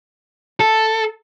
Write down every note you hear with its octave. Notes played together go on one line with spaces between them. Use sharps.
A4